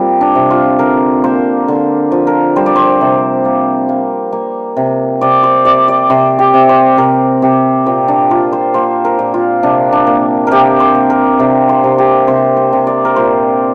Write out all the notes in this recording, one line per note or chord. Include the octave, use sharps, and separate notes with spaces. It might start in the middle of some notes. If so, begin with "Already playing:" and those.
Already playing: G3 A#3 C4 F4
D4
C3
F4
D3 A#4
A#3 C5
D3
F3
A#4
G3 C5
D5
C5
C3
A#3
A#3
A#3
C3
C3 D5
C5
C3 D5
D5
C3 C5
G4
C3
C5
C3 A#4
C3 G4
A#2 C4
D4
A#3 F4
C5
A#3 C5
A#4
A#2
F4
C3 D4
D4
A#3
C3 G4 A#4
C5
A#3
A#4
C3 D5
C5
C3
G4
C3 C5
C5
C3
D5
A#4
A#2 C5